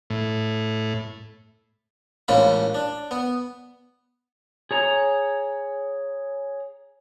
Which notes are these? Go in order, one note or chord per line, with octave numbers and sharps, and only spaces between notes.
A2
A1 G#2 C#3 A#3 F4 B5
D4
B3
G#4 C#5 A#5